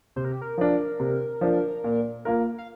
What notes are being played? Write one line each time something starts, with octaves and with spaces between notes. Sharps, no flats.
C3 C5
A#4
G4
A#4
F3 D4
C3
F3 D4
A#2
A#3 F4 A#4
F5